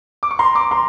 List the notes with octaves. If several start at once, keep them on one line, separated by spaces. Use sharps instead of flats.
D6
C#6
A#5 C6
C6 D6
A#5 C6